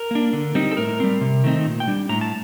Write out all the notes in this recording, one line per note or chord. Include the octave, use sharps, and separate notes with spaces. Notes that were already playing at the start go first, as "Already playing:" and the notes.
Already playing: A#4
A#3 D4
D3
G3 C4 D#4
A4
A2 A#4
G3 C4
C3
D#3 A3 C4 D#4
A#2
G5
G3 D4
A2 A#5
A5